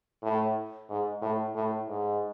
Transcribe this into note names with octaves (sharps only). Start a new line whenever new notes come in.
A2
G#2
A2
A2
G#2